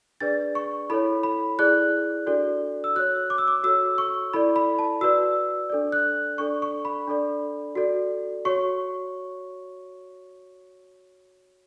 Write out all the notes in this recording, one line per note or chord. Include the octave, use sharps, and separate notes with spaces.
D4 G#4 B4 D5 A6
C#6
E4 A4 C#5 B5
B5
E4 G#4 D5 F#6
D4 F#4 A4 D5
E6
F#4 C#5 F#6
D6
E6
D6
F#4 A4 C#5 E6
C#6
E4 A4 D5 B5
B5
A5
F#4 B4 D5 E6
D4 A4 D5
F#6
D4 A4 D5 C#6
C#6
B5
D4 A4 D5
F#4 A4 D5
F#4 C#5 C#6